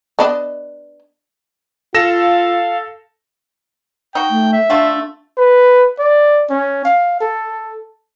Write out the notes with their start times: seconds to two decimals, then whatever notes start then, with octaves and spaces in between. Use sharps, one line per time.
0.19 B3 D4 D#5
1.94 F4 A4 F5 A#6 E7
4.15 D#4 F#4 G5
4.31 A3
4.53 E5
4.70 A3 D4 F4 F#4
5.38 B4
5.99 D5
6.50 C#4
6.85 F5
7.21 A4